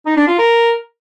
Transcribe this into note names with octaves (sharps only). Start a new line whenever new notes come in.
D#4
D4
F4
A#4